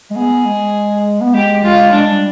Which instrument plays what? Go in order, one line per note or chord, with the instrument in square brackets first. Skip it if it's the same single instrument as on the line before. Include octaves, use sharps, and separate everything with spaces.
[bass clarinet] G#3
[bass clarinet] B3 [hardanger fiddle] G#4
[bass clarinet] G#3
B3
[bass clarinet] G#3 [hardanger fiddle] G4
[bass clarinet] G#3 [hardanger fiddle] F4
[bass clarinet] G#3 [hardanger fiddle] D4
[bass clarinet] G3